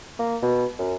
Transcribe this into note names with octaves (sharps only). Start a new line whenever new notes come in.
A#3
B2
F#2